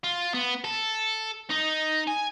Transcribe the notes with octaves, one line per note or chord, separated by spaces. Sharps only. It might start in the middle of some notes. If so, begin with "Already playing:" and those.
F4
B3
A4
D#4
G#5